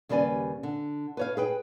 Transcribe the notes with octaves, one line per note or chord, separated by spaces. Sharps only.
D#2 C#3 G3 B4 D5 G#5
D3
B4 C#5 F5
G#4 B4 G5